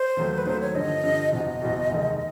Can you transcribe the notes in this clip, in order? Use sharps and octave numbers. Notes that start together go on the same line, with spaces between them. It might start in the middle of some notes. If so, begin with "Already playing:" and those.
Already playing: C5
D#2 D#3 F#3 A3
B4
D#2 D#3 F#3 A3 C5
C#5
G2 D3 F3 D#5
G2 D3 F3
F#1 E2 B2 D#5
F#1 E2 B2
F1 D#2 D#3 G#3